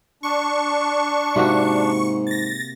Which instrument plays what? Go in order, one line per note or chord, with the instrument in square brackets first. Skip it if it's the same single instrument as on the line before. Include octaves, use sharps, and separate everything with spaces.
[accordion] D4 [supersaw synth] C#6
[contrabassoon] G#2 [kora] C3 A#3 F#4
[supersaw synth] A6 A#6